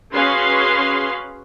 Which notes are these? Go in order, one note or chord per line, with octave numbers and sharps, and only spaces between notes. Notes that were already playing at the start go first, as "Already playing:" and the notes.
C#4 F#4 G#4 B4 F5 C6